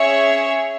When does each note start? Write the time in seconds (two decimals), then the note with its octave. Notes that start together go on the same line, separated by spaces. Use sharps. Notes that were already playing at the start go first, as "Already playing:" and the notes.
Already playing: C#4 G#4 C#5 E5